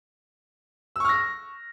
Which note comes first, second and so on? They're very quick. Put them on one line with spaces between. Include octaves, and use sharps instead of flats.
E6 C#6 F6 A#6